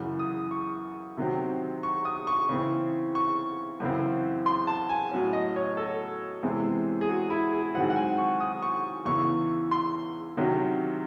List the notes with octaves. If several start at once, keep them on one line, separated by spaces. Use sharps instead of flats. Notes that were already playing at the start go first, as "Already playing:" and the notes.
Already playing: F#2 C#3 E3
D#6
C#6
C3 D#3 F#3 C4
C#6
D#6
C#6
C#3 E3 C4
C#6
F#2 C#3 E3 C4
C6
A5
G#5
A2 F#3 C#4
D#5
C#5
A4
E2 C3 E3 G#3 C4
G#4
F#4
E4
G#4
G#2 D#3 F#3 C4 F#5
F#5
G#5
C#6
D#6
C#6
E2 C#3 E3 C#6
C6
C3 D#3 F#3 C#4